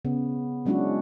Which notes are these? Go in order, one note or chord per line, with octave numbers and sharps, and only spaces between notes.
C#3 B3
F#3 G#3 C#4 D4 E4 F#4